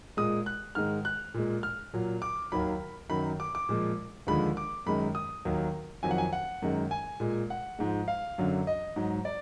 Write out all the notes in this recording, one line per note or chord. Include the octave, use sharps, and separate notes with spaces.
A#2 G#3 D#6
F#6
G#2 D#3 G#3 F6
F#6
A#2 G#3
F6
A#2 F#3
D6
D#2 D#3 F#3 B5
F#2 D#3 F#3 B5
D6
D6
A#2 F3 G#3
D#2 D3 F3 G#3 B5
D6
F#2 D#3 G#3 B5
D#6
D#2 D#3 F#3
F2 D#3 F#3 G#5
F#5
G#5
F#5
F#2 D#3 G#3
G#5
A#2 G#3
F#5
G#2 F3 G#3
F5
F#2 D3 F#3
D#5
G#2 F#3
D5